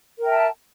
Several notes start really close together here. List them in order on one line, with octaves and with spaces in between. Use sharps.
A#4 G5 E5 A5